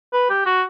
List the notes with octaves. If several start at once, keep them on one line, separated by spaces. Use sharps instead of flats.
B4
G4
F#4